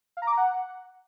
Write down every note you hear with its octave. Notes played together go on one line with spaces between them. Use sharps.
F5
A#5
D6
A#5
F#5